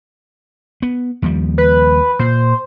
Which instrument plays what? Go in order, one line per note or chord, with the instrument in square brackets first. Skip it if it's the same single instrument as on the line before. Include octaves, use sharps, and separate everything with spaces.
[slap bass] B3
D#2 F3 G3
[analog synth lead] B4
[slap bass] A#2 [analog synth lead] C5